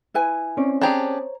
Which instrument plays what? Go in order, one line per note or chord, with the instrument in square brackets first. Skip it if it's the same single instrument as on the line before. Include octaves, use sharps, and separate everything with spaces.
[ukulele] E4 B4 G#5
[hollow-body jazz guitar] C4 C#4 D5
[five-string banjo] D4 G4 G#4 [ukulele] C5 C#5 A#5